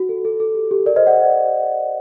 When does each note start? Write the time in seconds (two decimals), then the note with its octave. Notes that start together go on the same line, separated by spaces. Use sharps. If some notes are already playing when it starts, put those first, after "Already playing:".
Already playing: F#4
0.09 A4
0.25 A4
0.40 A4
0.55 G4
0.71 G4
0.86 A#4 D5
0.96 C5 D#5
1.07 D5 F#5